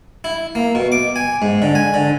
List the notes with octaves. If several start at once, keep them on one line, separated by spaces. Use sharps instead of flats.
E4
A#3
B2
D6
G#5
G#2
D3
G#5
D3